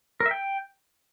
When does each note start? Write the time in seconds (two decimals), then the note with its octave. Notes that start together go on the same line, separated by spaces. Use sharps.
0.20 A#4
0.26 E5
0.31 G5